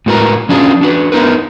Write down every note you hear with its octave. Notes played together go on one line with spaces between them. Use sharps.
A2 G#3 F#4 A#4 B4 A#5
F3 C#4 D4 F4 F#4 G#4
D4 F#4 B4
B3 D#4 A#4 B4